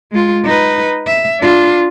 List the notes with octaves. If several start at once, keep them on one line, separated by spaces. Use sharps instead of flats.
G#3 F4
D#4 B4
E5
D4 F4